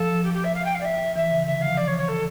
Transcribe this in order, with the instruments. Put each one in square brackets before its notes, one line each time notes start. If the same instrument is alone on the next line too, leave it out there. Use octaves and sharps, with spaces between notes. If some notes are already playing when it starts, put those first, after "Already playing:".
Already playing: [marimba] F3 [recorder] A4
[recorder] G4
G4
E5
F5
G5
F5
D5
E5
[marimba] E3 [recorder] E5
[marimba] C#3
[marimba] D3 [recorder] E5
[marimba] F3 [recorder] F5
[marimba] E3 [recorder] D5
[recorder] C#5
C#5
A4